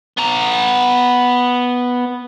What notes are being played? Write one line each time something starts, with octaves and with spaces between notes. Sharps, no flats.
B3 A#5